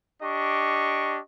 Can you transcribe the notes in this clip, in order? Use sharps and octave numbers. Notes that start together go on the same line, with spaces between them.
D4 G4 D#5 C#6